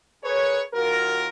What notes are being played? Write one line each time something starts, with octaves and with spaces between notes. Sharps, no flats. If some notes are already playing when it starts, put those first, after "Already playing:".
G#4 A#4 B4 C#5
D#2 F4 F#4 A#4